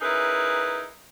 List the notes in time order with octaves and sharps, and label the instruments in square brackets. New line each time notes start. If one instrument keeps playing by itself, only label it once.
[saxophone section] C#4 D#4 E4 G#4 A#4 B4